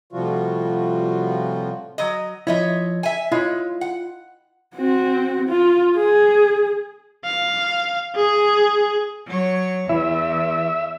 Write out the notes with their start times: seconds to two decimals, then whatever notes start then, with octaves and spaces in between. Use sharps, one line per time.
0.13 A2 C3 F3 G3 F4 F#4
1.98 F#3 D#5
2.47 F3 E4 C#5 D#5 E5
3.03 E5 G#5
3.32 G#3 E4 F4 C#5
3.81 F#5
4.76 C4 F#4
5.49 F4
5.97 G#4
7.25 F5
8.16 G#4
9.26 F#3 C#5
9.89 E2 E3 E5